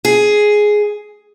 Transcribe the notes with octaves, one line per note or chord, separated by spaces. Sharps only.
G#4